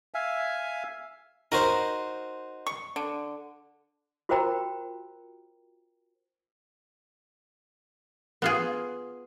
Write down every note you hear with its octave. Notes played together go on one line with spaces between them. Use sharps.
E5 F5 G#5
D#4 F#4 A#4 C5
C#6
D3
F4 F#4 A#4 C5 G5 A#5
B3 F4 G#4